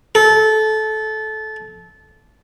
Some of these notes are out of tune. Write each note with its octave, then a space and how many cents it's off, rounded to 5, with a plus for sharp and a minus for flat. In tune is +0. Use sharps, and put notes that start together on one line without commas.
A4 -20